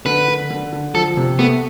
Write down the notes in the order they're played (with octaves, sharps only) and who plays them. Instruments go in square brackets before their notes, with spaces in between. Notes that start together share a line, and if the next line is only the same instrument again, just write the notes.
[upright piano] D3 [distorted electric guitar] B4
[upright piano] D3
D3
D3
[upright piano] F3 [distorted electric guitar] A4
[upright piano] C3
[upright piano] A3 [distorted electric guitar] B3